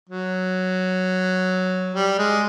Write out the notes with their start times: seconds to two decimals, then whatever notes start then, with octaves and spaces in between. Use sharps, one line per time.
0.10 F#3
1.95 G3
2.18 G#3